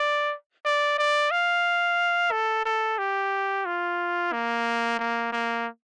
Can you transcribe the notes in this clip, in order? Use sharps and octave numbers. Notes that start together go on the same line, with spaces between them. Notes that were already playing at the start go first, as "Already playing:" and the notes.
Already playing: D5
D5
D5
F5
A4
A4
G4
F4
A#3
A#3
A#3